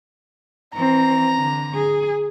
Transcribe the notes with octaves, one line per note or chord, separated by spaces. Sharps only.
E3 C4 A#5
D3
G#4